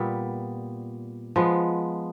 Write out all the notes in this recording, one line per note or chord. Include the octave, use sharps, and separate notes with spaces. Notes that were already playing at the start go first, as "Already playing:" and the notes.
Already playing: A#2 G3 B3
F3 G#3 B3